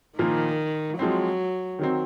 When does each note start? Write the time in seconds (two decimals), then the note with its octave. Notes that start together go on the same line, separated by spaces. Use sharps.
0.18 A#2 D#3 F3 A#3 F4
0.99 F3 F#3 G#3 C4
1.79 D#3 F#3 C4